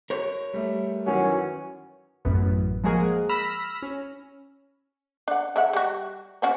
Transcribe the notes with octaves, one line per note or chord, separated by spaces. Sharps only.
A#4 C#5
G3 A3
F#2 D#3 E3 C#4 F#4
A1 F#2 B3
F3 G#3 A#3 F#4 G#4 A#4
B5 E6 F6 A#6
C#4
D4 F#5
G#3 E5 F#5
G3 F#4
C#4 F#4 C5